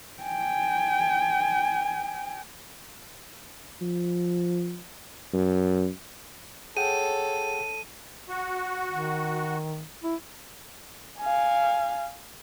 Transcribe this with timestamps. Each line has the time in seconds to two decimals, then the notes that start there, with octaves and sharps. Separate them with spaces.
0.23 G5 G#5
3.82 F3
5.34 F#2
6.77 G#4 A4 C#5 F#5 G5 D#7
8.29 F#4
8.91 D#3
10.03 E4
11.20 F5 G#5